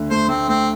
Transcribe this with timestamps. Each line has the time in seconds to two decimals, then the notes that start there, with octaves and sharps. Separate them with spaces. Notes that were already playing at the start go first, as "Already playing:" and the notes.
Already playing: D2 D3
0.10 A3 C5
0.28 A3 C4
0.48 A3 C4